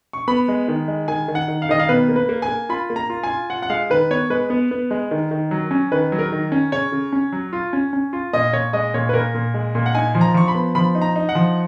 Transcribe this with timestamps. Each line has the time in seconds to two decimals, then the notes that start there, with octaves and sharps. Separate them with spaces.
0.13 C#6
0.28 B3 B5
0.48 G#3
0.68 D#3
0.88 G#3
1.08 D#3 G#5
1.28 D#3
1.35 F#5
1.48 D#3
1.62 F5
1.69 D#3 D#5
1.79 F5
1.89 B2 B4
2.09 A#3
2.16 B4
2.29 A#3
2.42 G#5
2.49 A#3
2.69 F4 B5
2.90 A#3
2.96 A#5
3.10 F4
3.23 G#5
3.30 F4
3.50 F4 F#5
3.62 F#5
3.70 G#3 F5
3.90 D#3 B4
4.11 B3 C#5
4.30 G#3 B4
4.50 B3
4.71 B3
4.91 G#3
5.11 D#3
5.31 D#3
5.51 F#3
5.71 C#4
5.92 D#3 B4
6.12 F#3
6.19 A#4
6.32 D#3
6.52 C#4
6.72 C#3 C#5
6.92 C#3
7.13 C#4
7.32 F#3
7.53 F4
7.73 C#4
7.93 C#4
8.13 F4
8.33 A#2 D#5
8.53 A#2 C#5
8.73 G#3 D#5
8.94 A#2 C#5
9.09 B4
9.13 A#2 A#4
9.34 A#2
9.54 G#3
9.75 A#2
9.86 F#5
9.95 D#4 G#5
10.15 F3
10.21 A#5
10.34 F3 C#6
10.48 B5
10.55 B3
10.75 F3 B5
10.95 D#4
11.02 A#5
11.16 D#4
11.29 F#5
11.35 F3